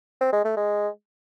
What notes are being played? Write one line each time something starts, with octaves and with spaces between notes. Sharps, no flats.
C4
G#3
A3
G#3